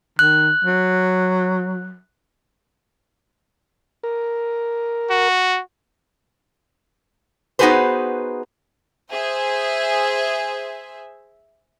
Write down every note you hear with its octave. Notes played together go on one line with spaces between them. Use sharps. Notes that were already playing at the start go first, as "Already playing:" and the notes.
D#3 F#6
F#3
A#4
F#4
B3 D#4 F#4 G#4 B4 C5
G#4 C5 E5